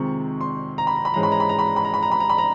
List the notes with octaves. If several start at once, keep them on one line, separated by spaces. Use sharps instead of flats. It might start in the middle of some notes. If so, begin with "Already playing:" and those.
Already playing: F2 C3 D#3 G#3 C4 C#6
C6
A#5
B5
A#5
B5
G#2 E3 G#3 C#4 A#5
B5
A#5
B5
A#5
B5
A#5
B5
A#5
B5
A#5
B5
A#5
B5
A#5